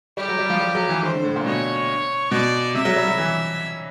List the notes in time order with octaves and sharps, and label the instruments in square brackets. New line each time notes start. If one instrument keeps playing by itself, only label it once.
[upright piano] G3 [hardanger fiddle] G4
[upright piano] F#3
G3
F3
G3
F#3
E3
[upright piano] D#3 [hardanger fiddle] C5
[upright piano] D3
A2
A#2
[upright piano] B2 [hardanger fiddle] C#5
[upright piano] B2 [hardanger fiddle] D5
[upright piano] C3 [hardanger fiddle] E5
[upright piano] F#3
G3
F#3
E3